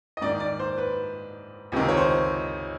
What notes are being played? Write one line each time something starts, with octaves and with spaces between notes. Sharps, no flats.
D#5
G#2 D#3 D5
D5
C5
B4
C#2 C3 D#3
C#5
C5